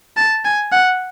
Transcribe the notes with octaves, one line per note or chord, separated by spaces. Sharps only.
A5
G#5
F#5